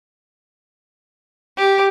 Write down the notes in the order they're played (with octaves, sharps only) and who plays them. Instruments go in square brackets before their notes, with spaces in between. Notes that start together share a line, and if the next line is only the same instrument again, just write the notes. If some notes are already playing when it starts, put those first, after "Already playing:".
[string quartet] G4